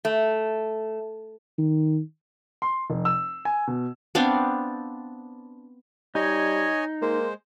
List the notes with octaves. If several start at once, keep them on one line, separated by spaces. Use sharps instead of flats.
A3
D#3
C6
F1
E6
G#5
B2
B3 C4 D4 F5
G3 D#4 C#5 D#5 G#5
G#3 A#3 C5